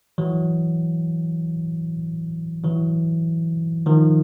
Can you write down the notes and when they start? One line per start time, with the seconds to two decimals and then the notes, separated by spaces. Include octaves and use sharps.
0.18 E3 F#3
2.64 E3 F#3
3.86 D#3 F3